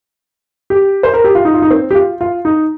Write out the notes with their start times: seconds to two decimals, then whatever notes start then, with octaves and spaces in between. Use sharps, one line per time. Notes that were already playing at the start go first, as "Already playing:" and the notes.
0.70 G4
1.03 C5
1.14 A#4
1.24 G4
1.35 F4
1.45 D#4
1.54 F4
1.62 D#4
1.71 C4
1.91 G4
1.95 F4
2.21 F4
2.45 D#4